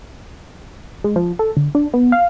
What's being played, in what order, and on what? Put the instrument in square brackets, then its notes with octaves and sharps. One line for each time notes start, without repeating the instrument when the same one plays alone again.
[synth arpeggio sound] G#3
F3
A4
D3
D4
B3
F5